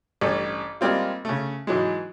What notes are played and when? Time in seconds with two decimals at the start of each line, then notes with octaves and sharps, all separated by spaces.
0.21 A1 G2 C#4 A4
0.81 G3 G#3 A#3 C4 F4
1.25 C#3 A3
1.67 G#2 E3 F#3 G#3